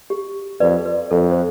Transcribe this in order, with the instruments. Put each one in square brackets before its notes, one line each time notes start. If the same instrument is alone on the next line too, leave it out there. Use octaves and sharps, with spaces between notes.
[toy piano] G4
[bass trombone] F2 [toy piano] B4 D5
[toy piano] B4
[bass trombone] F2 [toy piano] A4
[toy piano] C5